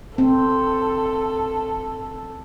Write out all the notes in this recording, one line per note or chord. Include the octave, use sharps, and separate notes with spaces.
C4 A4